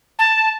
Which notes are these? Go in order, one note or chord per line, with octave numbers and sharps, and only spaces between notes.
A5